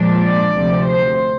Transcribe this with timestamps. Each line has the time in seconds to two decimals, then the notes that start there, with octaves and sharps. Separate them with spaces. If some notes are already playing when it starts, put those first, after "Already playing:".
Already playing: A#2 F3 G#3 D4
0.22 D5
0.54 D2 C3 F3
0.87 C5